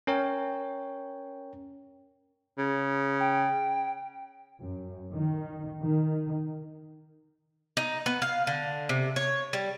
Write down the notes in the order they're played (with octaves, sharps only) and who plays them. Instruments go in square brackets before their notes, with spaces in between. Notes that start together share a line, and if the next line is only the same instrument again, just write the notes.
[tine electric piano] C#4 A#4 C#5 G5
[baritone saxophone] C#3
[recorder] G5
[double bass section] F#2
D#3
D#3
[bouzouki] D#4
B3
F5
D3
C3
C#5
G3